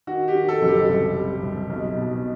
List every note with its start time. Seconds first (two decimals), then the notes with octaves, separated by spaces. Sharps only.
0.07 D#3 F#4
0.28 G4
0.34 D#3
0.48 A4
0.61 F#1
0.68 G4
0.89 C2
1.16 G3
1.42 C2
1.70 B1
1.97 B2